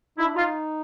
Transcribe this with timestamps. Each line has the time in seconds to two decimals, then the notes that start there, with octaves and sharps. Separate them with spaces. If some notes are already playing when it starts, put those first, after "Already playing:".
0.18 D#4 E4
0.26 D4
0.35 D#4 F4